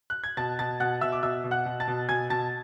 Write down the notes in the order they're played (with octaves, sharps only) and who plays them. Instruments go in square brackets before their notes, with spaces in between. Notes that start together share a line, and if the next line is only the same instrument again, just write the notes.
[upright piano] F#6
G#6
B2 A5 A6
B2 A5 A6
B2 F#5 F#6
B2 E5 E6
D6
B2 E5 E6
B2
F#5 F#6
B2
A5 A6
B2
B2 G#5 G#6
B2 A5 A6